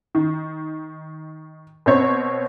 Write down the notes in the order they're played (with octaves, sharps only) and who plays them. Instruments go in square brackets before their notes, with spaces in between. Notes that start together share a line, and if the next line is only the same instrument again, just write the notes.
[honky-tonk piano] D#3
B2 C4 C#5